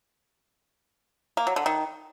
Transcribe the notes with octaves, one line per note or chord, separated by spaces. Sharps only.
A#3
F#3
D3
D#3